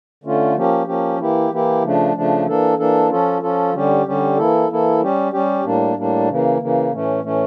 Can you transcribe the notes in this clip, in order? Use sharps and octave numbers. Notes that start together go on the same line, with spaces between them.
D3 A3 C#4 F4
F3 A#3 C#4 G4
F3 A#3 C#4 G4
E3 A#3 E4 G4
E3 A#3 E4 G4
C#3 F3 A3 D4
C#3 F3 A3 D4
E3 A#3 D4 A4
E3 A#3 D4 A4
F3 C#4 F4 A4
F3 C#4 F4 A4
D3 G3 C#4 G4
D3 G3 C#4 G4
E3 A#3 E4 A4
E3 A#3 E4 A4
G3 C#4 G4
G3 C#4 G4
A2 G3 A#3 D4
A2 G3 A#3 D4
C#3 E3 A#3
C#3 E3 A#3
A2 E3 A3 C#4
A2 E3 A3 C#4